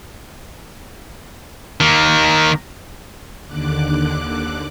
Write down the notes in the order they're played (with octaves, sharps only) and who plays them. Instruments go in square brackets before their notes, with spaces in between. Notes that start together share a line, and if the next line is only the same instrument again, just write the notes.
[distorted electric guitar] D#3 A#3
[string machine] D#2 D3 D6 F#6